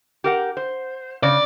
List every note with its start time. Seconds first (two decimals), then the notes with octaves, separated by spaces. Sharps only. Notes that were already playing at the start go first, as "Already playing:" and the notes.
0.24 G4 A#4 F#5
0.57 C5
1.23 C#3 D5